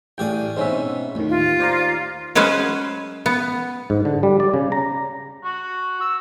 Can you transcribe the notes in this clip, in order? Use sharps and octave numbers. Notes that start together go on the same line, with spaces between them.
A1 A2 G4 G#4 D5 G5
G#2 B2 C4 C#4 E5
D#2 A2 D#3
F4
C5 D5 A#5
F#3 G#3 C#4 B4 C5
B3
G#2
D3
G3
D5
C#3
A#5
F#4
E6